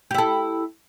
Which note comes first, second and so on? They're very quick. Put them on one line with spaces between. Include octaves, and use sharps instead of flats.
G4 E4 A4